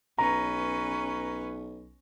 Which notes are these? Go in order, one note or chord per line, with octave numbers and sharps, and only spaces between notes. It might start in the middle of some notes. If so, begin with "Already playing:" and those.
B1 C#4 B4 A#5